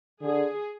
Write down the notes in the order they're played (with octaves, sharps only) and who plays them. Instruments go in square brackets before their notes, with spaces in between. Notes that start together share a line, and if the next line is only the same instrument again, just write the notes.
[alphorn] D3 [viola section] G#4